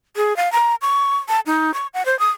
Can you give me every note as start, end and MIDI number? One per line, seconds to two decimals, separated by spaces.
0.16 0.36 68
0.37 0.51 77
0.52 0.75 82
0.82 1.16 85
1.29 1.40 81
1.46 1.74 63
1.74 1.87 85
1.94 2.05 78
2.06 2.18 72
2.19 2.30 87